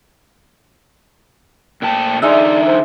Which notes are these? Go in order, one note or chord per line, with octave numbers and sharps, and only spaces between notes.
A#2 A3 G5 A5
D3 G#3 D#4 D5 E5
C5